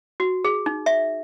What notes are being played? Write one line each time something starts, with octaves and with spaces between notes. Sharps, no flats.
F#4
G#4
D#4
E5